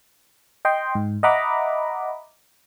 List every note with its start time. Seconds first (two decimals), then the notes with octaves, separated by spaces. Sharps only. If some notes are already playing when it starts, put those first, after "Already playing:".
0.65 D#5 G5 C6
0.95 G#2
1.23 D#5 E5 F#5 A#5 B5 D6